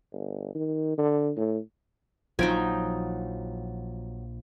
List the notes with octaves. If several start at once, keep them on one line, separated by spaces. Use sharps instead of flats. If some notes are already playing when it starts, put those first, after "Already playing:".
G1
D#3
D3
A2
A#1 F3 F#3 D#4 G5 G#5